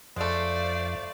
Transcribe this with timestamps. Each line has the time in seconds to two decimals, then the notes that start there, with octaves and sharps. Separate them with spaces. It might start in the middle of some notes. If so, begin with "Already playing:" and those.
0.16 F2 G#3 A3 C5 D5 F5